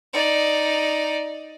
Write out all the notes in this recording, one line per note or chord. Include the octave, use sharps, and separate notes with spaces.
D#4 D5